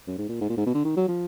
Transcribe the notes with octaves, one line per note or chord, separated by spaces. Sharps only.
F#2
G#2
A#2
G#2
A#2
G#2
B2
D3
D#3
F#3
F3